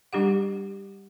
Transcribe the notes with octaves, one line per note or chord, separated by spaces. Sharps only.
G3 D4 G4 F#5